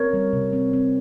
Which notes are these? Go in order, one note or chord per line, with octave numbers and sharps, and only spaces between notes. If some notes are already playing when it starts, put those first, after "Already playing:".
Already playing: C4 A#4 C#5
G3
C3
C4
C4